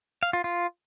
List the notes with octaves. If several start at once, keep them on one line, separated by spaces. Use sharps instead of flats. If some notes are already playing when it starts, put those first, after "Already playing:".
F5
F4
F4